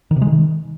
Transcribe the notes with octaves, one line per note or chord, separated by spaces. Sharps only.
D#3
C3
G#3
D#3